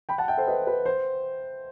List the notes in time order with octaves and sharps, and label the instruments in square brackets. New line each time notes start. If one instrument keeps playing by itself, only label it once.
[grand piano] G5 B5
F#5 A5
E5 G5
A4 C5
B4 D#5
B4
C5